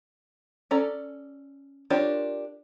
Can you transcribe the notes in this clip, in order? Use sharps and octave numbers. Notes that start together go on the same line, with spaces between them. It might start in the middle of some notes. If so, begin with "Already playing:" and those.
C#4 A4 D5 A#5
D4 F4 G4 A#4 C#5